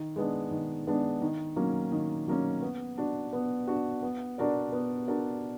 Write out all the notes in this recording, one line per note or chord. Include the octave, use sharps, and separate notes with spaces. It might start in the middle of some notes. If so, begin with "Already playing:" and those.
Already playing: D#3
G#3 B3 D4
D#3
G#3 B3 D4
D#3
F#3 A#3 C#4
D#3
F#3 A#3 C#4
B3
D4 F#4
B3
D4 F#4
B3
D4 F#4 A#4 D5
B3
D4 F#4 A#4 D5